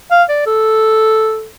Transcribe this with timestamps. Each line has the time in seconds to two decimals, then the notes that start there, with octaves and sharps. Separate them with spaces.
0.11 F5
0.29 D5
0.47 A4